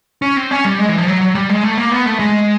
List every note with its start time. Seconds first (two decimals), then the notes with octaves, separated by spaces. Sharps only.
0.22 C#4
0.37 C4
0.51 C#4
0.65 G3
0.79 G#3
0.89 E3
0.98 F3
1.07 F#3
1.21 F#3
1.35 G3
1.49 G#3
1.63 A3
1.77 A#3
1.91 B3
2.06 A3
2.19 G#3